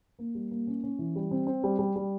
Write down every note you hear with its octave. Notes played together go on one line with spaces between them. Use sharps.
A#3
G3
A#3
C#4
C#4
E3
G3
C4
C4
G3
G3
G3